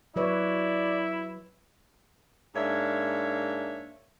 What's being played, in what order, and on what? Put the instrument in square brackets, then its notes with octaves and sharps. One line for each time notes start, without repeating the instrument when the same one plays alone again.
[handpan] F#3 B4 C#5 [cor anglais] E4 [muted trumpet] D5
[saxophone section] G#2 A#3 D4 C#5 E5